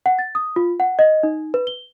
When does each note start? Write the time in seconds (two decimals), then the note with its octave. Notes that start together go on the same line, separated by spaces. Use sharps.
0.06 F#5
0.19 A6
0.35 D#6
0.56 F4
0.80 F#5
0.99 D#5
1.23 D#4
1.54 B4
1.67 G7